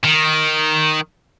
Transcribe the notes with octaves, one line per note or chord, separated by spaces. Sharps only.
D#3